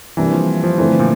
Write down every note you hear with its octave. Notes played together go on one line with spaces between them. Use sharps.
C3 E3 G3 A#3 D4
F3
F3
D3 E3 A3 C4 E4
A#2